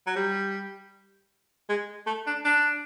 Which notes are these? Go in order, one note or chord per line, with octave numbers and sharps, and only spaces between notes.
F#3
G3
G#3
A3
D4
D4